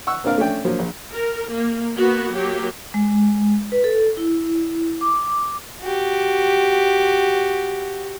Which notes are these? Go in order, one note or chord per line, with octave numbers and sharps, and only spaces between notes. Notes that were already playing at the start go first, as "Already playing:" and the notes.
F#5 C#6 E6
A#3 C4 D4 A#4 F5
A3 C#4 D4 G5
D3 F3 F#3 A#3
A#1
A#4
A#3
A#3 B3 F#4
F#3 A#3 G4
G#3
B4
A4
E4
D6
F#4 G4